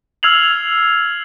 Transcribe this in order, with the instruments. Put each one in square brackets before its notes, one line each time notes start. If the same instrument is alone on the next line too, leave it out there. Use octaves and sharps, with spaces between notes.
[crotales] E6 F6 G#6 C7 F7 F#7